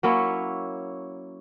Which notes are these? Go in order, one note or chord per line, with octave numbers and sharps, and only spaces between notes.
F#3 A#3 C#4 E4